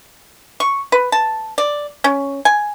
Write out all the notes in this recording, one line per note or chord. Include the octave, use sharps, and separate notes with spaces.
C#6
B4
A5
D5
C#4
G#5